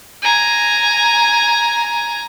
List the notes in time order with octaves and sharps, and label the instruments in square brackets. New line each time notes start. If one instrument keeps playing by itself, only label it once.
[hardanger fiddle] G#5 A#5